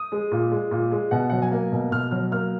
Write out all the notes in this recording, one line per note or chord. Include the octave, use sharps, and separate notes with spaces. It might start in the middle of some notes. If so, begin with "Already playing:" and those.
Already playing: D#6
G#3
A#2
G#3
A#2
G#3
B2 F#5
F#3 F#5
G#5
A#3
B2
B2 F6
F#3 F6
A#3 F6